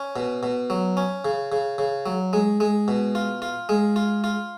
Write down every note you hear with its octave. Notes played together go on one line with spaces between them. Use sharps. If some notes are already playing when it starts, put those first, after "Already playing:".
Already playing: C#4
B2
B2
F#3
C#4
C#3
C#3
C#3
F#3
G#3
G#3
B2
F4
F4
G#3
F4
F4